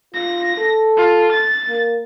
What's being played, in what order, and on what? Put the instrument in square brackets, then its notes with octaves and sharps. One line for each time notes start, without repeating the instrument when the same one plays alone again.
[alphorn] F4 [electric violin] A#6
[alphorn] A4
[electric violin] F4
A6
[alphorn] A#3